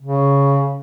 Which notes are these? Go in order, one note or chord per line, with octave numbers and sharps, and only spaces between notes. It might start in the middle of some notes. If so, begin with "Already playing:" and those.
C#3